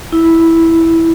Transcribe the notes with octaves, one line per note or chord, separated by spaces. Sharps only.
E4